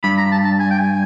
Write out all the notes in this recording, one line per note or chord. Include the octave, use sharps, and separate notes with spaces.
G2 B5
A#5
A5
A5
G#5
G5
G#5